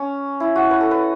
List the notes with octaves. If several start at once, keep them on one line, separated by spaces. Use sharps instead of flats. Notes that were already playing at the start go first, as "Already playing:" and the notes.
Already playing: C#4
E4
F#4
B4
A4
B4